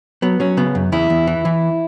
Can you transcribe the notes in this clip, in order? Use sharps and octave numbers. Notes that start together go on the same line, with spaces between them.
F#3 B3
F#3 C#4
C#3 B3
F#2
E2 E4
E2
E3
E3